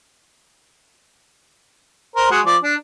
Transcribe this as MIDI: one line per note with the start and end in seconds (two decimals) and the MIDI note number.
2.16 2.28 70
2.16 2.28 72
2.31 2.40 56
2.31 2.40 66
2.46 2.56 53
2.46 2.56 74
2.63 2.75 62